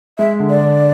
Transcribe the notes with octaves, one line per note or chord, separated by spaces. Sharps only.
G#3 E5
D3
D5
D3